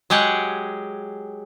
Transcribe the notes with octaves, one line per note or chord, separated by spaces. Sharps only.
F#3 G#3 G4 G#4 F#5